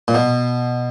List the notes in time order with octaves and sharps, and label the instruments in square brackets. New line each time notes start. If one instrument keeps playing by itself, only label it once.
[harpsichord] A#2
B2